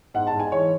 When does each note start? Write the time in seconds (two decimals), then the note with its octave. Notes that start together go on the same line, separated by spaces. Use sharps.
0.14 G#2 F#5
0.27 A5
0.33 G#2
0.40 G#5
0.52 E3 C#5